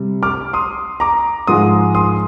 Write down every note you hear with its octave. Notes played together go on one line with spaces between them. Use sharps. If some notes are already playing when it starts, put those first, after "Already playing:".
Already playing: C3 G3
D6 F6
C6 D#6
A#5 D6
G#2 F3 G#3 C6 D#6
C6 D#6